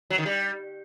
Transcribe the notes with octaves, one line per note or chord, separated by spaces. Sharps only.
F#3
D#3
G3